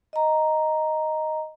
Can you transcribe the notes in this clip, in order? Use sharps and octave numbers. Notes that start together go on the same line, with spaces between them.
D#5 A#5